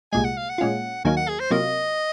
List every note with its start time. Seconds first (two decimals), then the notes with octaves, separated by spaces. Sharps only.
0.12 C2 A#2 G#3 G#5
0.24 F#5
0.37 F5
0.49 F#5
0.58 A#2 G#3 C#4 F4
1.05 D#2 D#3 F#3 A#3 D#4 G#5
1.17 F#5
1.28 G#4
1.40 C5
1.51 C3 F#3 A#3 F4 D#5